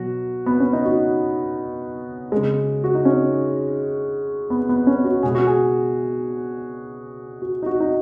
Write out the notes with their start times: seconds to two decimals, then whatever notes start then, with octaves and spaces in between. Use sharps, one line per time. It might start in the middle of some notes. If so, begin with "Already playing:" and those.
Already playing: B2 F#3 F#4
0.46 B3
0.60 C#4
0.73 D#4
0.85 F#4
2.32 C#3 G#3
2.84 F#4
2.95 D#4
3.05 C#4
4.50 B3
4.69 B3
4.87 C#4
5.05 F#4
5.23 B2 G#3 G#4
5.35 F#4
5.47 G#4
7.42 F#4
7.62 D#4
7.66 F#4
7.80 D#4